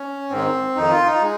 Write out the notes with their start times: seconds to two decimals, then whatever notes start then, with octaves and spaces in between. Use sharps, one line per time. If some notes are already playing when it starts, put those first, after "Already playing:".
Already playing: C#4
0.30 G#2 D#3 C4
0.76 F2 D#3 D#4
0.92 F4
1.06 D#4
1.22 G#3